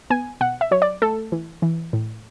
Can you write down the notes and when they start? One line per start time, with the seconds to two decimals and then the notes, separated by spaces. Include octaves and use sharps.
0.10 B3 G#5
0.41 B2 F#5
0.61 E5
0.71 F#3 C#5
0.82 D5
1.02 A3 A4
1.32 E3
1.62 E3
1.93 A2